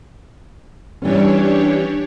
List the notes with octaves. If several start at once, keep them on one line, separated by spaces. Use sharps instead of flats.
E3 G3 C#4 D4 G4 C#5